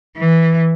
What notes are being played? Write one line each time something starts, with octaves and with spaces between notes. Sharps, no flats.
E3